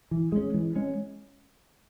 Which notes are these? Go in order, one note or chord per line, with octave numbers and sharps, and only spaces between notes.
E3
G#3 C#4
E3
G#3 C#4